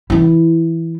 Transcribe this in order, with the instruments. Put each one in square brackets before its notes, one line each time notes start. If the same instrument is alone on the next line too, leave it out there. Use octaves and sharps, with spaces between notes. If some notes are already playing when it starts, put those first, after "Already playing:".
[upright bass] E3 E4